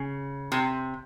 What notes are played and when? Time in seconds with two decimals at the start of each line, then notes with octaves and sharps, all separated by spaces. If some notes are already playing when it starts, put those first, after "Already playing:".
Already playing: C#3
0.52 C3